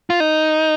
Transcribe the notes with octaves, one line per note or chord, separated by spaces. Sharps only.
F4
D#4